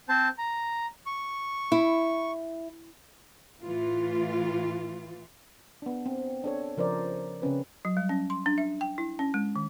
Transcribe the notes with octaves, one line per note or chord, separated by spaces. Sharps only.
C4 C5 A5
A#5
C#6
E4
A2 E3 F4
B3 D4
C4
D4 A4 C#5
C#3 F3 A#4 C5 D5
C#3 C4 C#4 B4
F#3
G3
C#4
C6
D4
E5
G5
E4
C#4
G#3
D#3